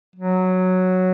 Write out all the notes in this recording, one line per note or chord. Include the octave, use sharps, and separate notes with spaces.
F#3